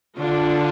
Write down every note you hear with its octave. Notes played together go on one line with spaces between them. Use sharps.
D3 D4 F4